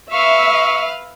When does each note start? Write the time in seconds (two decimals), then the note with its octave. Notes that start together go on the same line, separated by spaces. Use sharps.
0.12 B4 E5 F5 C#6